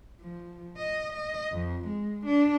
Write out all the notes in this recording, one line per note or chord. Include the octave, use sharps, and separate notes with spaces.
F3
D#5
D#5
F2
G#3
D4